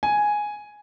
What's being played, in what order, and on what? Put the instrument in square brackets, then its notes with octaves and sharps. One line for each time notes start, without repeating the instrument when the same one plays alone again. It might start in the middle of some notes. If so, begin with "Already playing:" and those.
[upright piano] G#5